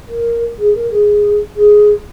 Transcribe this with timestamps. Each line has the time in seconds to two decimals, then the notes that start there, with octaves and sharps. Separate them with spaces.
0.09 A#4
0.58 G#4
0.75 A#4
0.90 G#4
1.56 G#4